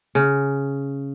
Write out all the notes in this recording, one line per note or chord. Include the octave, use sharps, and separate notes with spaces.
C#3